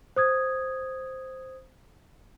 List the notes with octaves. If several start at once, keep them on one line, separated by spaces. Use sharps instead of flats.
C5 D#6 G#6